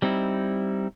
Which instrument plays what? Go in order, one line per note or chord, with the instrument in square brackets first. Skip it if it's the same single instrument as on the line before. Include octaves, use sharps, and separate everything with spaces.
[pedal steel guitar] G3 C4 D#4 E4